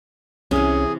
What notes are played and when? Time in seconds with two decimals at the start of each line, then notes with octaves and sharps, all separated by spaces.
0.51 C2 C3 E3 C#4 G#4